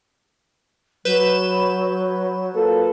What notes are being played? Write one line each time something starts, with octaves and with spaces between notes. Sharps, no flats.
F#3 B4 G6 E7
A#3 F4 A4 B4